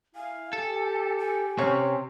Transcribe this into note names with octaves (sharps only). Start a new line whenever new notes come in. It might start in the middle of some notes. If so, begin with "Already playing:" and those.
E4 F5 G#5
G4 A4
G#5
C3 C4 C#4 C#5